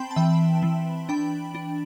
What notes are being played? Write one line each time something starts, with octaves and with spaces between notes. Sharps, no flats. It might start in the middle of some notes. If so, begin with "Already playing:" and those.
Already playing: C4 G5 A5 B5 C6
A5
E3 E5 G5
E3
D4 G5 B5
D4